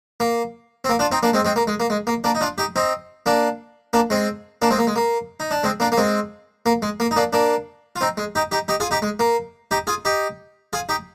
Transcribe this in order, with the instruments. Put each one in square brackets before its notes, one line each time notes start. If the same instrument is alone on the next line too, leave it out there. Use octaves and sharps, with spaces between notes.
[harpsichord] A#3
C4
A#3
D4 F4
C4 D#4
A#3 D4
G#3 C4
G#3 C4
A#3
G#3
A#3
G#3
A#3
A#3 D4
D#4
D4 F4
D#4 G4
C4 D#4
A#3 D4
A#3 D4
G#3 C4
A#3 D4
G#3 C4
A#3
G#3
A#3
D#4
D4
G#3 C4
A#3 D4
A#3
G#3 C4
A#3
G#3
A#3
D#4
A#3 D4
A#3 D4
F4
C4 D#4
G#3
D#4 G4
D#4 G4
D#4 G4
F4 G#4
D#4 G4
G#3
A#3
D#4 G4
F4 G#4
D#4 G4
F4 G#4
D#4 G4